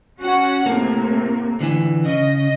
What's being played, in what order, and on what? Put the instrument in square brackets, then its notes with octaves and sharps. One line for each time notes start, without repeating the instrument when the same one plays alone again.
[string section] C#4 F#4 F#5
[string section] A2 C3 [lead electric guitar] A#3
[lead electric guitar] D3 E3
[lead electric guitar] C#3 [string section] D#5